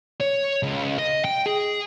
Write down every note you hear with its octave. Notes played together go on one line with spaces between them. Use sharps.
C#5
C#2
D#5
G5
G#4